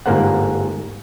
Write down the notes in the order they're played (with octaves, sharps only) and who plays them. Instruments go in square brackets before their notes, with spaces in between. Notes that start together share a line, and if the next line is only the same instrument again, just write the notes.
[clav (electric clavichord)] G1 G#2 A#3 A#4 C5 F#5